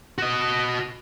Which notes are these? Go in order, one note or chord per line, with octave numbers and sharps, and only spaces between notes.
F#4 D#5